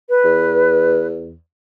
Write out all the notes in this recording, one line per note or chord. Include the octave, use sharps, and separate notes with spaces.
B4
E2